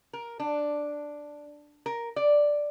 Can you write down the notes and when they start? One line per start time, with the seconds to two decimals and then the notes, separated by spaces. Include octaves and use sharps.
0.13 A#4
0.40 D4
1.86 A#4
2.16 D5